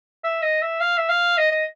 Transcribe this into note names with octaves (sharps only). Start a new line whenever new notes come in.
E5
D#5
E5
F5
E5
F5
D#5
D#5